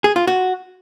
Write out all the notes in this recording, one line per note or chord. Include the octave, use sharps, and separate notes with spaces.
G#4
F4
F#4